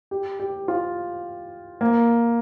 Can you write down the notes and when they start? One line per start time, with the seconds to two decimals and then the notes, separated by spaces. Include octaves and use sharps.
0.11 G4
0.39 G4
0.68 F4
1.81 A#3